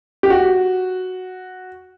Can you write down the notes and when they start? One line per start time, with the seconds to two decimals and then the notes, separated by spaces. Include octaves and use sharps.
0.23 G4
0.30 F#4